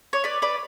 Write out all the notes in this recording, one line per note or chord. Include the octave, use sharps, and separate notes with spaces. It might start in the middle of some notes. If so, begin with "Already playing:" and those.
C#5
B4 D5
B4 D5